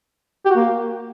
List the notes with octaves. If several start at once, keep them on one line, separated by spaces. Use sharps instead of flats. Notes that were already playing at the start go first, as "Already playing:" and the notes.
G4
F#4
A#3